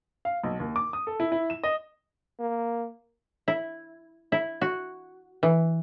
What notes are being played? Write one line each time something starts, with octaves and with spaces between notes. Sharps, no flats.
F5
B1
D#2
D6
D#6
A4
E4
E4
E7
D#5
A#3
E4
E4
F#4
E3